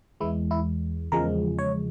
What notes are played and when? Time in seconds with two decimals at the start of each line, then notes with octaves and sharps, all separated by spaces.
0.20 E2 E3 G#3 E4
0.51 E4
1.12 E2 C#3 F3 G#3 A#4
1.58 C#5